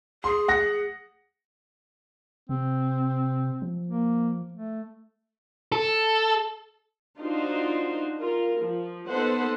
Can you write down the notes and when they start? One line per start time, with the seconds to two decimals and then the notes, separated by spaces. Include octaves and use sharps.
0.24 G#4 C6
0.48 F#5 A#6
2.49 C3 C4
3.62 F3
3.87 A#3
4.52 A3
5.72 A4
7.18 D4 D#4 F4 F#4 C5
8.19 F4 A#4
8.61 F3
9.07 B3 D#4 A4 B4 C5 F#5